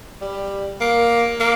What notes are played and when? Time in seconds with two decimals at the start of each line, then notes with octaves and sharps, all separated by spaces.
0.21 G3
0.81 A#3
1.40 A#3